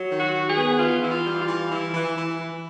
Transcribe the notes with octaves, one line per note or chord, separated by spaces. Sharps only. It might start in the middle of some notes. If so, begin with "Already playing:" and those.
Already playing: F#3
D#3
F#4
D#3
G#4
B3
E3 F4
E3 E4
F4
G3
F4
E3
E3 E4
E3
E3
E3